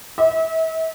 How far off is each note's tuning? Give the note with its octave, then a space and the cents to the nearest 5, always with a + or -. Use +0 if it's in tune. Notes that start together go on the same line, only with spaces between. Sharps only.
E5 -40